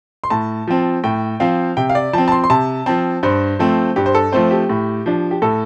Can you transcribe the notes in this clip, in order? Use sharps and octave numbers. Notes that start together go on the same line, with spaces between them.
C6
A2 A5
F3 C4
A2 G5
F3 C4 F5
C3 G5
F5
D5
F3 C4 A5
A5
C6
C6
C3 A5
F3 C4 A5
G2 C5
F3 A3 C4
G2 G4
C5
A4
F3 A3 C4 C5
G4
A2
F3 D4
G4
A2 A4